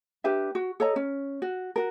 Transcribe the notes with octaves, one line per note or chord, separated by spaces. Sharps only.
D4 G4 B4 E5
F#4
A4 C#5 D#5 A#5
C#4
F#4
F#4 A#4